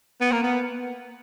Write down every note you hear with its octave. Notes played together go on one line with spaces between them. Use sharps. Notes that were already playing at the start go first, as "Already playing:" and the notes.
B3
A#3
B3